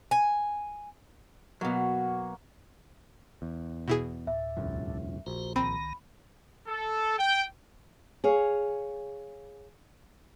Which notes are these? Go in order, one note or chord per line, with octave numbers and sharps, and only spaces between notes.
G#5
B2 F#3 A#3 F#4
E2
B2 E4 G#4
D2 A2 E5
E1 C#2 F#2
A#1 F#4 C5 A#5
C2 D#3 C4 A#5 B5
A4
G5
G#4 C#5 F5